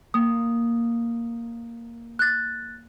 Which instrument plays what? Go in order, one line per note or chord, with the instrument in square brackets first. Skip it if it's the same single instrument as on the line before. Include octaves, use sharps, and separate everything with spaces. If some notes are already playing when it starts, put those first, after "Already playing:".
[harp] A#3 [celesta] D#6
[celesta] F#6 A6